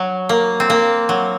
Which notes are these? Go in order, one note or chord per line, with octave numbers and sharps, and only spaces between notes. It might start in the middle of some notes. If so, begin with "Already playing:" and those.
Already playing: F#3
A#3
C4
A#3
F#3